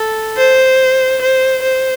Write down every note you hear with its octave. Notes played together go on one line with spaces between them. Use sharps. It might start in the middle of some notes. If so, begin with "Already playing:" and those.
Already playing: A4
C5
C5
C5